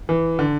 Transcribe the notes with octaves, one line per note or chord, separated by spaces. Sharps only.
E3
D3